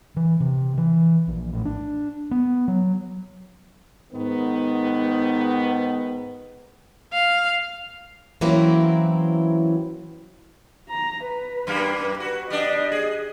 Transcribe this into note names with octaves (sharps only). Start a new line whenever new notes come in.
E3
C3
E3
A#1
A1
D4
B3
F#3
G#2 D#3 B3
F5
E3 F#3 A#3 C4 C#4 E4
A#5
B4
F#2 G3 A#3
F#4
G3 D4 D#5
G#4